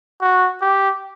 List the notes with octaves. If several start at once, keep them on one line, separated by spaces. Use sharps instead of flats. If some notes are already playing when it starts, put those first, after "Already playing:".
F#4
G4